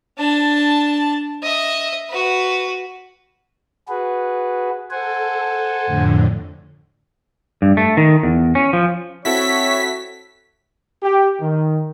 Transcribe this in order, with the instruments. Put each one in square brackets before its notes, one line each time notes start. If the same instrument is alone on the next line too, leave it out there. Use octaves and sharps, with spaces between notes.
[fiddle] D4 A5
D#5 E5
F#4 B4
[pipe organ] F#4 G#4 B4
[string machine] A4 [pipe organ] C5 F#5 G#5
[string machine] F2 A2 D3
[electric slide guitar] G2
A3
D#3
E2
C#4
F3
[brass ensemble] C4 C#5 [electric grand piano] E4 F#4 A4 [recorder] E5 [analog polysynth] B6
[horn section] G4
D#3